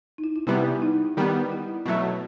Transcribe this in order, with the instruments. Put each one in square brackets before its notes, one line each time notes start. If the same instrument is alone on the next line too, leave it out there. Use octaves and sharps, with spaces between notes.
[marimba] D#4
E4
E4
[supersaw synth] C3 E3 G3 B3 [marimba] E4
[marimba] D#4
[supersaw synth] D#3 G3 B3
[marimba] E4
[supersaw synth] B2 F#3 A3 [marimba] F#4